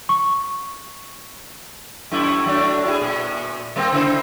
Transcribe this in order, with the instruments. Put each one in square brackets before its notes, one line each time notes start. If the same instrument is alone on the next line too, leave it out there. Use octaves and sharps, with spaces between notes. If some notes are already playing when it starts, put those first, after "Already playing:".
[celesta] C#6
[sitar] F#2 A3 E4
F#3 A3 D4
E4 F#4 G#4
A#2
G3 A#3 C4
C#3 E4 C5